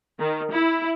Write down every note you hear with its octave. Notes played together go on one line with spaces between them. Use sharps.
D#3
E4